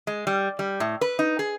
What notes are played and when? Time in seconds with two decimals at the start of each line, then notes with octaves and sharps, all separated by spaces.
0.07 G#3
0.27 G3
0.59 G3
0.80 A2
1.01 B4
1.19 D#4
1.39 G#4